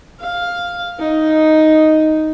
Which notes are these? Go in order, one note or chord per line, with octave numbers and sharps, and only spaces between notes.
F5
D#4